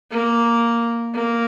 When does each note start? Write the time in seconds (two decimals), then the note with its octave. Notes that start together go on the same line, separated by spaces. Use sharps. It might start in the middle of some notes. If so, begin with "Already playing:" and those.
0.11 A#3
1.14 A#3